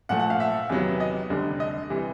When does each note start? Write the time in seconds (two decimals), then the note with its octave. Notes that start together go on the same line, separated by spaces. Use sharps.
0.09 A#2 F3 A3 F#5
0.20 F#5
0.30 F5
0.40 E5
0.69 E2 C3 D#3 F#3 B3
1.00 D#5
1.30 F1 D#2 D3 G3
1.60 D#5
1.90 C3 E3 G3